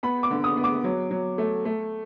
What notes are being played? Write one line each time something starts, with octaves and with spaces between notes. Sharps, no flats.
B3 B5
D6
D3
D#6
B3
D6
F#3
F#3
A3
A3